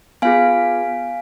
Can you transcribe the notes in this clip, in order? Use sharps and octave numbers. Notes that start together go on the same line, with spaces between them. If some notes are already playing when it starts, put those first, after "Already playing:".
B3 F4 G#4 F5 G#5